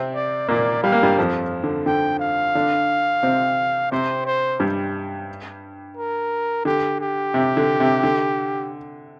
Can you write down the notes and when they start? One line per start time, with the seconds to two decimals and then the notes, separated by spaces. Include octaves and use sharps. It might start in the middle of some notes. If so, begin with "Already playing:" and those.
Already playing: C3 C4
0.15 D5
0.48 A#2 A#3 D5
0.83 G3 F5
0.92 A#3
1.03 G2 G3
1.18 F2 F3
1.64 D3
1.86 D3 G5
2.20 F5
2.55 D3 D4
3.23 C3 C4
3.92 C3 C4 C5
4.26 C5
4.60 G2 G3
5.97 A#4
6.65 D3 G4
7.01 G4
7.34 C3
7.57 D3
7.80 C3
8.03 D3